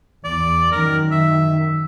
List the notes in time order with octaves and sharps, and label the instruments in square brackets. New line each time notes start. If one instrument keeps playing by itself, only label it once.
[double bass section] E2 [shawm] D5
[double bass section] F#2 D#3 [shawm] A#4
[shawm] E5